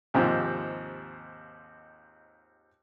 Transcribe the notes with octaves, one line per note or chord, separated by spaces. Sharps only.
D#2 G#2 C3 F3